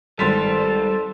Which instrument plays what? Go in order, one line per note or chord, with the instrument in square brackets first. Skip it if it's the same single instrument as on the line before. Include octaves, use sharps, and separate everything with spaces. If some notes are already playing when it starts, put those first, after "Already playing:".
[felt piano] G#1 C6 B6 [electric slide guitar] G3 [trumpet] A4